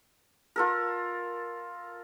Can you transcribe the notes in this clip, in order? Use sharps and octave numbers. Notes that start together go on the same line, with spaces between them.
F4 A4 A#4